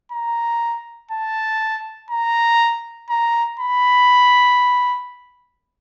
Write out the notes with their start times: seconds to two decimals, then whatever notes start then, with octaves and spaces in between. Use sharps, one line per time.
0.12 A#5
1.11 A5
2.11 A#5
3.10 A#5
3.60 B5